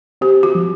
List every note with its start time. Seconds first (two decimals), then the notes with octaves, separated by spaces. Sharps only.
0.21 C4 G4
0.43 F#4
0.55 F3